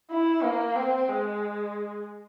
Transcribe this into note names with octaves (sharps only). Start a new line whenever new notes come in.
E4
A#3
C4
G#3